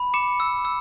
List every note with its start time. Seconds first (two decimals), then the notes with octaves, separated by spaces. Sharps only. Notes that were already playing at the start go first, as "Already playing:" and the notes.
Already playing: B5
0.14 D6 C#7 E7
0.40 E6
0.65 E6